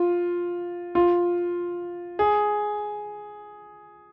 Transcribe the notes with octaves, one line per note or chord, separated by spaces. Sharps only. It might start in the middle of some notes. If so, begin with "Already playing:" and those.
Already playing: F4
F4
G#4